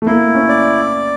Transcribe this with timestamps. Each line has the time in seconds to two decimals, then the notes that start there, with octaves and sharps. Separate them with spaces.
0.02 A3
0.06 A#3 E4
0.35 C#4
0.49 D5